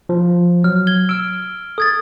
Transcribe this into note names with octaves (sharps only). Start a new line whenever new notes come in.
F3
F#3 F6
G#6 G7
E6 F6 D7
A4 D#6 G#6 A6